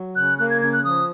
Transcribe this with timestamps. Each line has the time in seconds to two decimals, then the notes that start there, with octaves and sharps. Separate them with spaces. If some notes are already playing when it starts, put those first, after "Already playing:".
Already playing: F#3
0.16 C#3 F#6
0.39 A#3 F#6
0.50 G#6
0.62 C#3 G#6
0.73 F#6
0.85 F3 D#6